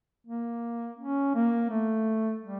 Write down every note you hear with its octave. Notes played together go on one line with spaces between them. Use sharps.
A#3
C#4
A#3
A3
G3